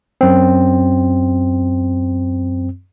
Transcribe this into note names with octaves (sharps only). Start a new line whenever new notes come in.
F#2 C4